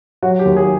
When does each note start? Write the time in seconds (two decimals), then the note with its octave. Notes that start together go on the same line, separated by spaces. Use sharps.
0.22 F#3 F#4
0.39 G4
0.45 D#2
0.56 G#4